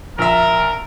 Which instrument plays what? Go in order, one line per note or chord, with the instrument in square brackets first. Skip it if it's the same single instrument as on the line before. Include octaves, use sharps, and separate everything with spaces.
[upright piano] A#1 E5 [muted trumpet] A#4